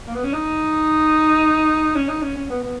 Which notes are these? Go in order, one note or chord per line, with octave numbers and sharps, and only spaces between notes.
A#3
B3
C#4
D#4
C#4
D#4
C#4
C#4
B3
B3